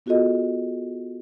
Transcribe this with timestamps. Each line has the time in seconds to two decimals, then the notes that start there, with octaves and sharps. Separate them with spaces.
0.06 B3 F4 F#4 G#4 A4 D#5